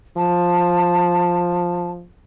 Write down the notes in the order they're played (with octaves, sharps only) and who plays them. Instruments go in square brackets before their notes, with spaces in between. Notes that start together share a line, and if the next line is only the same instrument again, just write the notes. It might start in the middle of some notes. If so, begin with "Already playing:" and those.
[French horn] F3 [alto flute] A5